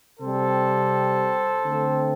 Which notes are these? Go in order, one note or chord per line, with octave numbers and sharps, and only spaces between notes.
C3 G3 C4 A4 C5
D3 A3 C4